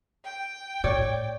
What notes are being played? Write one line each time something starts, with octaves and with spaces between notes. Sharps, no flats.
G5
A2 C#5 D5